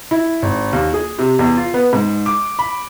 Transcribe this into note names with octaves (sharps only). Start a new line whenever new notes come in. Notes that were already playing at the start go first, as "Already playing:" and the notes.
E4
G#1
D#2
G#4
C3
E2
F4
B3
G#2
D6
B5